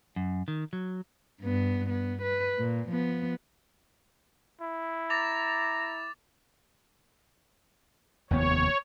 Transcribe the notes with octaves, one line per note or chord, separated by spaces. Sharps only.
F#2
D#3
F#3
G2 B3
B3
B4
A#2
F3 B3
E4
A#5 D6 A6 F7
F1 D#2 B3 C#5